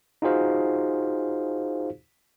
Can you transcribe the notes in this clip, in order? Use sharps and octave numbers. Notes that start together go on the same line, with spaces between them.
D#4 F4 F#4 G#4 C5 F5